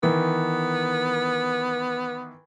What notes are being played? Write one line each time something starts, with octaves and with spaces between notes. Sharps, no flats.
D#3 E3 B3